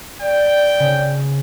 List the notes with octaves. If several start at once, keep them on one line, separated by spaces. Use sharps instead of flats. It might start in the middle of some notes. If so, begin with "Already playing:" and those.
D5 G5
C#3